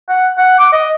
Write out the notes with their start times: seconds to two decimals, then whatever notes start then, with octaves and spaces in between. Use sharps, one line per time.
0.09 F#5
0.38 F#5
0.59 D6
0.72 D#5